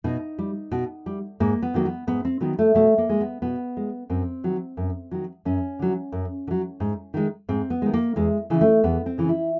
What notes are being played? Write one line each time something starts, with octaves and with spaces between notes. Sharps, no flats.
B2 D#4
G3
B2
G3
G#2 A#3
B3
D#3 F#3 A#3
B3
G#2 B3
C4
D#3 F#3 B3
A3
B2 A3
A#3
G#3
B3
B2 B3
G#3
F#2 C4
D#3 F#3
F#2
D#3 F#3
F#2 C#4
D3 F#3
F#2
D3
F#3
G#2
D#3 G#3
G#2 C4
B3
D#3 G#3
A#3
E2 G#3
C#3 E3
A3
E2 B3
C4
C#3 E3
E4